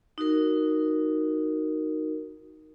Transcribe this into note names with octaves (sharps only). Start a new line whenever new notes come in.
D#4 F#4 A#4